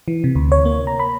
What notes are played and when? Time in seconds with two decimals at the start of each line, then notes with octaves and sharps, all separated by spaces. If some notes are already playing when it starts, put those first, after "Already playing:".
0.08 E3
0.24 C3
0.35 D2
0.52 C#5
0.65 A#3
0.87 A#5
1.00 B5